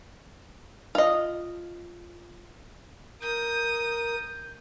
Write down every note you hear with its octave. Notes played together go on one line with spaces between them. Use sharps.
F4 D#5
A#4 D#6 G6